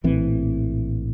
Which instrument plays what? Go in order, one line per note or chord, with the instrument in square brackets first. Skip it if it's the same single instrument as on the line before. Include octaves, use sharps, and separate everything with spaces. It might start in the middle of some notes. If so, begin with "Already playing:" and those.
[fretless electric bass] A#1 A2 E3 C4